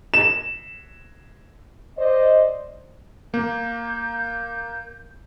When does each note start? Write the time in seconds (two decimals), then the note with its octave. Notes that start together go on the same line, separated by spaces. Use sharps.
0.14 E7
1.98 C5 D5 D#5
3.34 A#3 G6